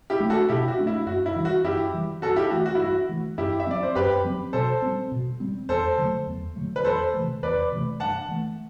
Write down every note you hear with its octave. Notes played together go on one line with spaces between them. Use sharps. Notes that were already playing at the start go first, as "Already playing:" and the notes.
E4 G4
A3 D4
F#4 A4
B2 E4 G4
F#4
A3 D4
E4
F#2 F#4
E4
E3 G3
F#4
F#2 E4 G4
E3 G3
G2 F#4 A4
E4 G4
E3 A3 F#4
F#4
E4
G2 F#4
E3 A3
F#2 E4 G4
E5
F#3 C4 D5
C5
F#2 G4 B4
F#3 C4
B2 A4 C5
G3 C4
B2
G3 C4
E2 A4 C5
D3 F#3 A3
E2
D3 F#3 A3
B4
E2 A4 C5
C3 E3 A3
E2 B4 D5
C3 E3 A3
G2 F#5 A5
E3 A3